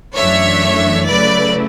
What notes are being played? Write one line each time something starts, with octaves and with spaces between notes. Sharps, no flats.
F#2 E3 A3 D4 C#5 E5
C#3 F#3 A3 E4 B4 D5